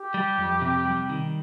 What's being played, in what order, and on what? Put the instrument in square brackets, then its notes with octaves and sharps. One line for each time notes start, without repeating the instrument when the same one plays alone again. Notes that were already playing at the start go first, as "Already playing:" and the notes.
Already playing: [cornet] G4
[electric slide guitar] G3
F2
C3
G3
D#3